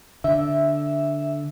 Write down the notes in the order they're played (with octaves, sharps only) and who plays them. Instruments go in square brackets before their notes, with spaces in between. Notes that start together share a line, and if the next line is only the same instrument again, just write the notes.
[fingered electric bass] D3 [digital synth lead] E5